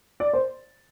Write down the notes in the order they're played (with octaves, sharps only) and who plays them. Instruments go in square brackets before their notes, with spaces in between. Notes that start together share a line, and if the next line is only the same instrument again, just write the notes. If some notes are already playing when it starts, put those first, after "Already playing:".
[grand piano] D5
C5